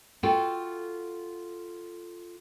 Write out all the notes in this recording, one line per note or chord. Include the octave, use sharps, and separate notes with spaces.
F4 F#4 A4 G5